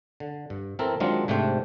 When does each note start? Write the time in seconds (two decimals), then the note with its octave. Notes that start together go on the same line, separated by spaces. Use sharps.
0.20 D3
0.50 G2
0.79 E3 C4 A4 A#4
1.00 D#3 F#3 G#3 C4 D4 F4
1.28 G#2 C3 A3 D4 C5 G5